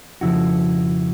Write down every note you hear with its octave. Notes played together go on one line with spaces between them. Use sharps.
F2 C#3 F3 E4 F#4